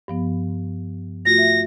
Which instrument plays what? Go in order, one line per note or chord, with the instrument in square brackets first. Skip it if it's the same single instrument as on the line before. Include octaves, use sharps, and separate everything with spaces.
[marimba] G2 F3 B3
[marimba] A3 F4 F#4 [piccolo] A#6
[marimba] E5